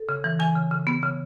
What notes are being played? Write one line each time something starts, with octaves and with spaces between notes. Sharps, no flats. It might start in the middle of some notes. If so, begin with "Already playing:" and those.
Already playing: A4
C#3
E3
E3 G#5
C#3
C#3
B3
C#3